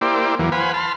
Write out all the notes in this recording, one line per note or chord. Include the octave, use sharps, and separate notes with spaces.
A#3 E4 G4 C5 D5
E2 E3 F#3 A#3
B4 C5 F5 F#5 G#5 B5
A5 B5 C6 F6